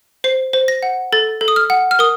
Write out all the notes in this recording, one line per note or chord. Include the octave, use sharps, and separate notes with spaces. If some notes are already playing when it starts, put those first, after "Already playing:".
C5 C7
C5
A#6
F#5
A4 A6
A4
D#6
F6
F#5
F6
A#4 D#6